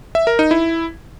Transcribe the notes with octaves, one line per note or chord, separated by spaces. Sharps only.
E5
A#4
D#4
E4